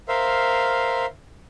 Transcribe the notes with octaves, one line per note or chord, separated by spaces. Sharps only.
A#4 C5 E5 F5